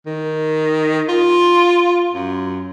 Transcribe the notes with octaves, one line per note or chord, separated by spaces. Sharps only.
D#3
F4
F#2